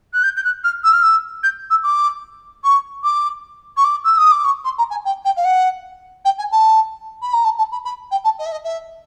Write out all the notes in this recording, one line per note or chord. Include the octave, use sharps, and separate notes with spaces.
F#6
G6
G6
F#6
F6
E6
F6
E6
G6
E6
D6
C#6
D6
C#6
D6
E6
D#6
D6
C#6
C6
A#5
G#5
G5
G5
F5
F#5
G5
G#5
A5
B5
A#5
A5
A5
B5
B5
G5
A5
D#5
E5
D#5
E5